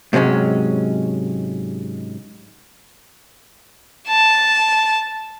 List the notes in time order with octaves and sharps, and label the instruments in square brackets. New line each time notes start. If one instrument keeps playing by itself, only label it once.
[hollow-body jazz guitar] G#2 C3 F#3 G#3 C#4
[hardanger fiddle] A5